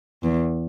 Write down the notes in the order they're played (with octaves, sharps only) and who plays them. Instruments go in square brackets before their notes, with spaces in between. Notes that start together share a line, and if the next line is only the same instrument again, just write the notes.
[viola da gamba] E2